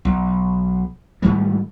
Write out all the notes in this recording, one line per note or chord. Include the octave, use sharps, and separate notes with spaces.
B1
G#2 D#3 G3 A3